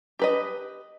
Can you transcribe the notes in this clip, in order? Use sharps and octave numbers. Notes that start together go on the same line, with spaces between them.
G4 B4 D#5